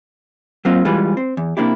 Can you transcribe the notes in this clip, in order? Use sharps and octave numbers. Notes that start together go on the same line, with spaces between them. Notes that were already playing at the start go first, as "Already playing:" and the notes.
F#3 A#3 C4 D#4 F4
E3 G3 G#3 F4 B4
C4
E2
C3 A#3 D4 E4 G4